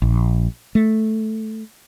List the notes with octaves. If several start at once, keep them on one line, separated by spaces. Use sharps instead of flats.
A#1
A3